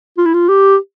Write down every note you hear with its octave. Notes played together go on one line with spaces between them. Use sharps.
F4
E4
F4
G4